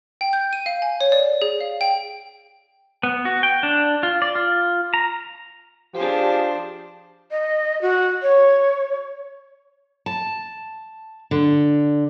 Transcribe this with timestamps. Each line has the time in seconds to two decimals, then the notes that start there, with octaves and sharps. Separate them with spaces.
0.21 G5
0.33 G6
0.53 D#7
0.66 F5
0.82 G#5
1.01 C#5
1.12 D5
1.42 G#4
1.61 F5
1.81 G5
3.03 B3
3.25 F#4
3.43 G5
3.63 D4
4.03 F4
4.22 D5
4.35 F4
4.94 A#5
5.95 F3 D4 G4 G#4 C5
7.31 D#5
7.81 F#4
8.22 C#5
10.06 A5
11.31 D3